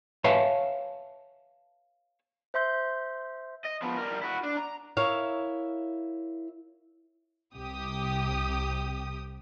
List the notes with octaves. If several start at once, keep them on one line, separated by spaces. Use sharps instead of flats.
B4 C#5 E5 F5 G#5 A5
C5 E5 C6 G6
D#5
F3 B3
G3 A#4
E4 F#4
D4
A#5
E4 A#4 C#5 E5 F5
C2 C3 G4 D#6